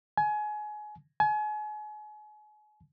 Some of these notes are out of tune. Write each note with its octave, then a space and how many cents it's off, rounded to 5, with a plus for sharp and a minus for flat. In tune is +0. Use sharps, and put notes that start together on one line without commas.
G#5 +25
G#5 +35